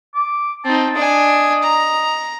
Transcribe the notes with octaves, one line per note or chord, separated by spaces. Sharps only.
D6
C4 D#4 A5
D4 D#5 G#5
A#5